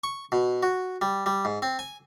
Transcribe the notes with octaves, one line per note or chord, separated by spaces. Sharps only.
C#6
B2
F#4
G3
G3
G#2
C4
G#5